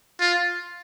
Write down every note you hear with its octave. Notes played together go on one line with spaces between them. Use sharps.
F4